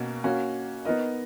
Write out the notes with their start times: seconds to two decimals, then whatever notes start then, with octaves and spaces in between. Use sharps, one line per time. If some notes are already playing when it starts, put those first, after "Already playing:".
Already playing: B2 A#3 C#4 F#4 A#4
0.24 A#3 C#4 F#4
0.85 B3 D#4 A#4 D#5